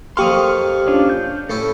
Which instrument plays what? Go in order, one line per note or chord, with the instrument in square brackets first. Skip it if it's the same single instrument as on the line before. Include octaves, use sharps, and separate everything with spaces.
[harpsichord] F2 A#3 [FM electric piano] G4 F6 [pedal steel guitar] C6 C#6 D#6
[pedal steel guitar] C#4 D4 F4
G6
[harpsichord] A2 C#4 E4 [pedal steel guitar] A4